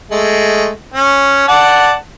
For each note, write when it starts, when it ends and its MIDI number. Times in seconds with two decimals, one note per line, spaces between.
0.11 0.70 56
0.11 0.70 57
0.94 1.47 61
1.48 1.94 74
1.48 1.94 78
1.48 1.94 81